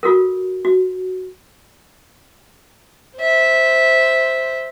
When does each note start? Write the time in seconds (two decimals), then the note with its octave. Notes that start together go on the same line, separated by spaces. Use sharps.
0.03 F4 F#4 A4 A#4
0.65 F#4
3.18 C5 E5